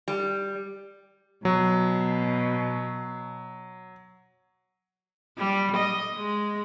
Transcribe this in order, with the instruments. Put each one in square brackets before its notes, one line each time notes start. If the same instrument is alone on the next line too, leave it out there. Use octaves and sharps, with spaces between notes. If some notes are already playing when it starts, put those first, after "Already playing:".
[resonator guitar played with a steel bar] G3
[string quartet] B2 [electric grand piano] F#3
[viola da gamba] G3
D#5
G#3